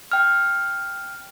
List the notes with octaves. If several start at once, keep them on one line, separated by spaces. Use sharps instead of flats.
G5 F6